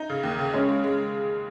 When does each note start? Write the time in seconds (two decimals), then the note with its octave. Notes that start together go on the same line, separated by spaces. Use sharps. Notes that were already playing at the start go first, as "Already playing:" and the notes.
Already playing: D#4
0.09 C#3
0.23 D#2
0.39 C#3
0.54 G#3 C#4
0.69 G#3
0.84 G#3